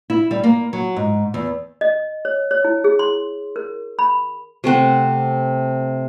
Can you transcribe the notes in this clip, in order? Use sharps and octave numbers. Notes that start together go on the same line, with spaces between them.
E4
G3
A#3
F#3
G#2
E2
D#5
C#5
C#5
E4
G#4
C6
A#4
B5
C3 A3 C4 F#5